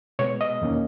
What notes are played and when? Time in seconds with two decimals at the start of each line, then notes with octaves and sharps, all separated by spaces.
0.19 B2 G#3 B3 C#5
0.41 D#5
0.62 E2 D#3 A#3 C#4